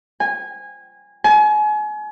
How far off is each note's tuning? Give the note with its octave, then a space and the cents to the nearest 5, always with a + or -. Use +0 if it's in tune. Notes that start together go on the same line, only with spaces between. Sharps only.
G#5 -20
G#5 +35